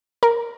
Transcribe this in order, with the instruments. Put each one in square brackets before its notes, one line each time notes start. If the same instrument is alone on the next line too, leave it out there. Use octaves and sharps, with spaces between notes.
[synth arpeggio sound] A#4